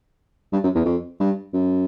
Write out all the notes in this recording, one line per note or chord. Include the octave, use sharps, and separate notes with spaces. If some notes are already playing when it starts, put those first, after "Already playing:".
G2
F#2
E2
F2
G2
F#2